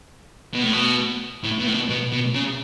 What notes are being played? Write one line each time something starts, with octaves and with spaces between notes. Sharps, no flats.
B2
A2
B2
A2
B2
A2
B2
B2
B2
C#3